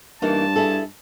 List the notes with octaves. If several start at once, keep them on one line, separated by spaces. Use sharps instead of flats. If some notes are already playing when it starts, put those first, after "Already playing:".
G2 E3 A#3 D#4 A5
E4 G#4 A4